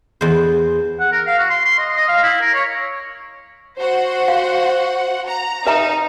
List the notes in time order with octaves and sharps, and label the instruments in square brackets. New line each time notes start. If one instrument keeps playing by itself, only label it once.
[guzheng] E2 C5
[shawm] F#5
A#4
F5
F#4
C6
C6
D#5
D#5
F5
E4
A#4
C#5
[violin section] F#4 C5 F#5
[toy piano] F5
[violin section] A#5
[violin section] D#4 [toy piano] B4 E5 A#5